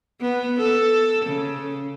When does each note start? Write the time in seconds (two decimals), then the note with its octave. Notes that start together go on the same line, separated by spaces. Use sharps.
0.21 B3
0.59 A4
1.25 C#3